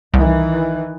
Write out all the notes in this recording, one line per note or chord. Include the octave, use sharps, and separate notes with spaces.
C2 D#3 E3